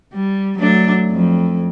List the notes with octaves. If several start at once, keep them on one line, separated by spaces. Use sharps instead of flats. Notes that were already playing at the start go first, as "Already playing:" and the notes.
G3
F#3 A3 D4
F2